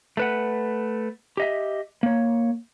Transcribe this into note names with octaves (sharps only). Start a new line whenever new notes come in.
A3 B4 F#5
G4 D#5 E5
A#3 C#5